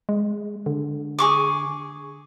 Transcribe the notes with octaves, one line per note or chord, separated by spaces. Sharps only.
G#3
D3
G#4 C#6 D6